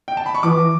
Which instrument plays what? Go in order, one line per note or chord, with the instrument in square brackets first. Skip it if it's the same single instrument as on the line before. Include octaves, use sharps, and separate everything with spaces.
[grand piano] G5
A5
B5
C#6
[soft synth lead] E3 [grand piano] D6